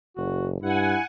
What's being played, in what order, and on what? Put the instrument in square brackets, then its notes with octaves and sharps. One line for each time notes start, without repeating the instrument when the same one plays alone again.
[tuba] F#1 [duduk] F#4
[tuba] G2 [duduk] E4 [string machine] F#5 G#5